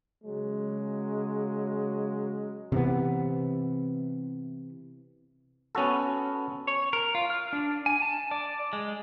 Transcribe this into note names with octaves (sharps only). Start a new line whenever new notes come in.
C#3 F#3 G#3
C3 E3 B3
B3 C#4 F#4 A4
C#5
A#4
F4
F6
D4
G#5
A5
D5
G#3